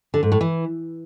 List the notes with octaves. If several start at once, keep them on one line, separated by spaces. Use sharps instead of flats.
D3
G#2
A2
E3